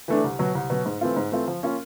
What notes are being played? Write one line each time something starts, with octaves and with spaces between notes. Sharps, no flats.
E3 A3 D4
C2
B2 F#3
C2
B2 F#3
G#2
E3 A3 C4 F4
G#2
E3 A3 C4 F4
F3
A#3 C#4 F4 A#4